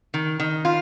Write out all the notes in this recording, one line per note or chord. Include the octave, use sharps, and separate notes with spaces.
D#3
D#3
F4